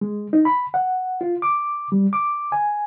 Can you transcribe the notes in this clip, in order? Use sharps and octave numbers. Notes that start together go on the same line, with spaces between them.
G#3
D#4
B5
F#5
F4
D6
G3
D6
G#5